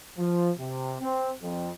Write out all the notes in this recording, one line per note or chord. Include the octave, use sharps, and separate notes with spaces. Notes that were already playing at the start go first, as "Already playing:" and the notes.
F3
C3
C4
F2